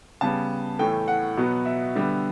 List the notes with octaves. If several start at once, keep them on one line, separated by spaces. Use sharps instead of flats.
C#3 G3 B3 A5
A2 E3 A3 G5
F#5
B2 F#3 B3
E5
D3 G3 B3